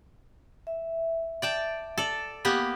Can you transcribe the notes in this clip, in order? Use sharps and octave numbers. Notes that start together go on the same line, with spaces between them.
E5
D5 G5 A5
A4 D5
A#3 B3 G4